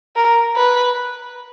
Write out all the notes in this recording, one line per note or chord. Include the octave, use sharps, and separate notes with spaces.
A#4
B4